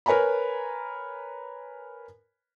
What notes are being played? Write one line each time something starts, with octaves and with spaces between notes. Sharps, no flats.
A#4 B4 C#5 G#5 A#5 B5